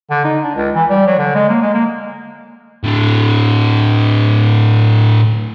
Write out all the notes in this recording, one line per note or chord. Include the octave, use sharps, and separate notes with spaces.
D3
D#4
D4
C#2
E3
G3
F#3
D3
G#3
A#3
G#3
A#3
A2 D3